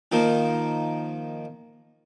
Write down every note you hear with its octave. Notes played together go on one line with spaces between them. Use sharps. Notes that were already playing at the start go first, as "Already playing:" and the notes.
D#3 F3 A#3